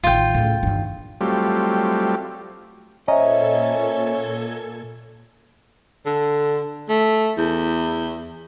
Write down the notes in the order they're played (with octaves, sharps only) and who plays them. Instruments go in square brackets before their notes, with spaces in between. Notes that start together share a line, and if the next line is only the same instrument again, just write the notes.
[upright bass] A1 D#3 [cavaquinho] F4 G5
[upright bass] C#2 A2
G2 D#3
[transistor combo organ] F#3 G3 A3 C4 F4 G4
[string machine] A#2 A4 G#6 [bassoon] C#4 [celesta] C5 E5 A#5 [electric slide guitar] D#5
[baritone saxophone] D3
A3
E2